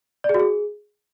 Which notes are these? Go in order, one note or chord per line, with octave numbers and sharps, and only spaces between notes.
D5
G#4
F#4
G#4